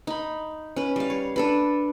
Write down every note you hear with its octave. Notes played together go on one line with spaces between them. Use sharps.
D#4 B5
C#4 B4
G3 F5
C#5
D4 A4 B4